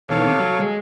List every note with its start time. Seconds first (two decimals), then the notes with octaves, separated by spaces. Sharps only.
0.10 B2 D#3 E3 A4 C#5 F5
0.25 C3
0.39 F#3
0.60 G#3 G#4